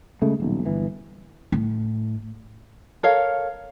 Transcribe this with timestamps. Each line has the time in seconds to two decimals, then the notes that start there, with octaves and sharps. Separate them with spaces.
0.22 C#3 G#3 A3
0.40 D#1 B1
0.65 G1 E3
1.52 A2
3.03 A4 A#4 C#5 F5